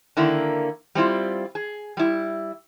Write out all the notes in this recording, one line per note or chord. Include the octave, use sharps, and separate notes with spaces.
D3 D#3 A#3 E4
G3 C4 E4 F4
G#4
G3 E4